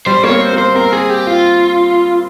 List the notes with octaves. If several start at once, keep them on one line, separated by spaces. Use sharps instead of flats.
G3 C5
A#3 C#5
C4
C5
A#3
C5
C4 A#4
G#4
G4
F4